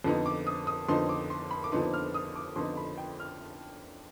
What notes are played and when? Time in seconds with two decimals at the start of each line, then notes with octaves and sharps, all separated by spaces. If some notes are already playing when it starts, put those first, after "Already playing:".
0.04 F2 D3 F3 B3 D#4
0.26 D6
0.47 D#6
0.67 D#6
0.88 F2 D3 F3 B3 D#4 C6
1.09 D6
1.30 C6
1.51 B5
1.64 D6
1.72 F2 D3 F3 B3 D#4 C6
1.94 F6
2.14 D#6
2.36 D6
2.56 F2 D3 F3 B3 D#4 C6
2.77 B5
2.98 G5
3.20 F6